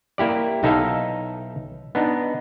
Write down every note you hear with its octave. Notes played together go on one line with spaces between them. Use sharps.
A#3 E4 G4 D5
B1 D#4 E4 A4 E5 F5
B3 D4 D#4